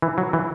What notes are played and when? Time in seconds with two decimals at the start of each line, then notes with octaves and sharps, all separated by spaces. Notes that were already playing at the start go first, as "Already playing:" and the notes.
0.02 E3
0.18 F#3
0.33 E3